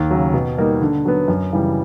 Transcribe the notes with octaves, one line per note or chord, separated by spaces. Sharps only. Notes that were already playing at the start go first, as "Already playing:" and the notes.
Already playing: D#2
C#3 F#3
B2
G3 A#3 D#4
D3
F#3 B3
F#2
C#3 E3 G3